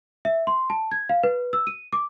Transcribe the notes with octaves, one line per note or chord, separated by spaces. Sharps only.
E5
C6
A5
G#6
F5
B4
E6
D#7
D6